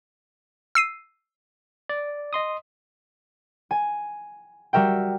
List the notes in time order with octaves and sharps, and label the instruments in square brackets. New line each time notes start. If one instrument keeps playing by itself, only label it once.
[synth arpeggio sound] E6 C7 D#7
[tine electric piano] D5
D#5 C6 D#6
[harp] G#5
G3 F#4 A#4 E5 G5